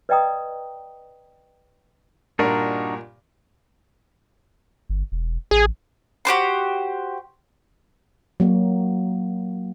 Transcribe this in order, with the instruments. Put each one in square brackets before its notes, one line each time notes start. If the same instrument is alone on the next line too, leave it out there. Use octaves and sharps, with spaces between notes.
[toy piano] B4 D5 D#5 G5 A#5 D#6
[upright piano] G2 A#2 [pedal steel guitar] D4 D#4 F#4 [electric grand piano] A#4
[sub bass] G1
E1
[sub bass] A1 [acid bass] G#4
[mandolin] F#4 G4 C5 C6
[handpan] F#3 A#3